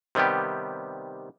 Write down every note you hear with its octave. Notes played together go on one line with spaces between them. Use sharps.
C3 D#3 G3 B3 G4